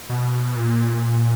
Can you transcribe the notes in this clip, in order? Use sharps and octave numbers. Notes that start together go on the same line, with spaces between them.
B2
A#2